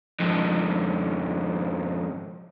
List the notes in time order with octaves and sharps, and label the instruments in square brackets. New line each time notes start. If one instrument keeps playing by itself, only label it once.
[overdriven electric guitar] F2 G#2